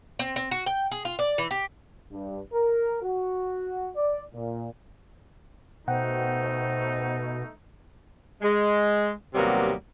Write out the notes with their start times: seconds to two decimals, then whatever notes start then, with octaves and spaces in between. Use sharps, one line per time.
0.19 C4
0.36 C4
0.51 F#4
0.66 G5
0.92 G#4
1.05 F4
1.19 D5
1.38 E3
1.51 G4
2.12 G2
2.53 A#4
3.03 F#4
3.96 D5
4.35 A#2
5.88 B2 A3 D#4 C5 F#5 G5
8.41 G#3
9.34 D#2 C3 F#3 G3 A#3 B3